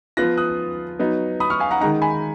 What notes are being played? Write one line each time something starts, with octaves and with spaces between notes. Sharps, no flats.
F3 B3 F4 F#6 A#6
D#6 F#6
F#3 B3 D#4
B5 D#6
C#6 F6
F5 G#5
F#5 A#5
D#3 G#3 D#4 F#5 A#5
G#5 B5